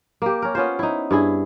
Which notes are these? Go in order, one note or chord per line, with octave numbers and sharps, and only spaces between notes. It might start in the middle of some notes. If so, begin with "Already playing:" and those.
A#3 G4
C#4 A#4
B3 C#4 F4 C5
D#4 E4
G2 E4 G#4